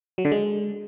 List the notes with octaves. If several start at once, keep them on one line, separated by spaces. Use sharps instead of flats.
F#3
D3
G#3